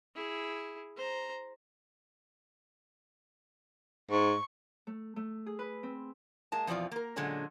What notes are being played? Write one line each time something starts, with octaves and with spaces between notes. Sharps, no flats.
E4 G#4
C5 A#5
G#2 C#6
A3
A3
G#4
B4
C4
G#3 A#3 A5
F2 B2 E3 F3 D5 F5
A#3 A#4
A#2 D3 F#3 G#3 C#4 D4